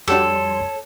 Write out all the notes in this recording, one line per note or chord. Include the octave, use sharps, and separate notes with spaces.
F2 G3 D4 F#4 G4 A4 C#5 C6